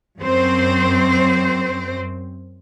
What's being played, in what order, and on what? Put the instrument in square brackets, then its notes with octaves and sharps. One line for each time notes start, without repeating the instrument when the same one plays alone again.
[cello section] F#2 C4 C5